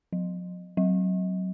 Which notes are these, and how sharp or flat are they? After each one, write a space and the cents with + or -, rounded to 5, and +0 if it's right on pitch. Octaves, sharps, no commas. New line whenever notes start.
F#3 -45
F#3 +15